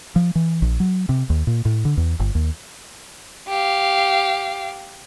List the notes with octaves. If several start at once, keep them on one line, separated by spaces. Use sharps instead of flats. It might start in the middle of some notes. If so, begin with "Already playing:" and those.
F3
E3
A#1
F#3
C3
D#2
A#2
A2
D3
E2
G1
D#2
G4 F5